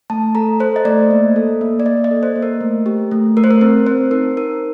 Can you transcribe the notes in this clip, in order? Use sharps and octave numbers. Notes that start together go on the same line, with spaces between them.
A3 A5
A4 A#5
A4 C5
D#5
A3 D5
A#3
A4
A#3
D5
A#3 D#5
D#5
A4
C5
A#3
A#4
A3
G4
A3
A3 A#4
C5
A#4
C4 A#4
C4 C5
D#4 A#4
D#4 A#4